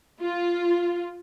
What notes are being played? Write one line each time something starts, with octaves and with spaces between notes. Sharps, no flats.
F4